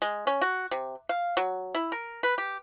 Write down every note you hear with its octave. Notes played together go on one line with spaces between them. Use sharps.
G#3
C#4
F#4
C3
F5
F#3
E4
A#4
B4
G4